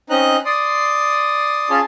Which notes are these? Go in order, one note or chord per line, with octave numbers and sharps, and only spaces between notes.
C4 C#4 D#4 D#5 A#5 F#6
D5 C6 D#6
C#4 F4 G#4 C#5 A5 C6